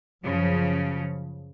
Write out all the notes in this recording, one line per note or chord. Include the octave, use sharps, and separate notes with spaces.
F#2 C#3 F3